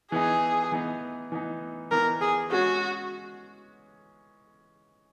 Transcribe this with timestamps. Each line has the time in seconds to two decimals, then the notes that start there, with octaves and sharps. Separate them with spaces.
0.12 E3 B3 D#4 G#4
0.72 E3 B3 D#4
1.32 E3 B3 D#4
1.91 E3 B3 D#4 A#4
2.22 G#4
2.51 G#3 C#4 F#4 G#4 C#5